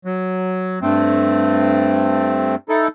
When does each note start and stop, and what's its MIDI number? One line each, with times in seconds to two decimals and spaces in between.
0.05 0.79 54
0.82 2.55 43
0.82 2.55 57
0.82 2.55 60
2.69 2.88 63
2.69 2.88 64
2.69 2.88 69